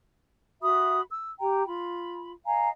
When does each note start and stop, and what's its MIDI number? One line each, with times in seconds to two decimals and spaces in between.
0.62 1.00 66
0.62 1.00 76
0.62 1.00 83
0.62 1.00 87
1.10 1.31 88
1.39 1.65 67
1.39 1.65 79
1.39 1.65 82
1.65 2.32 65
1.65 2.32 83
2.45 2.70 75
2.45 2.70 77
2.45 2.70 80
2.45 2.70 82